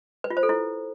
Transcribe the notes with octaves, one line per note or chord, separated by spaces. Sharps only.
B4
F4
C5
A4
E4